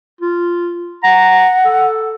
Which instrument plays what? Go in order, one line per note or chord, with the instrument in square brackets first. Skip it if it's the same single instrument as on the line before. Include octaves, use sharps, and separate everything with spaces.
[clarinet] F4
[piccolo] F#5 [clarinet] A#5
[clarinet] A4